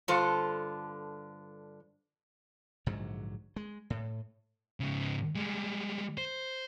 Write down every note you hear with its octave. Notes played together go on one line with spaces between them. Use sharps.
G2 D3 F4 A4 C5
A#1 G#2 D3 F#3
G#3
A2
G#2 C#3
G3 G#3
C5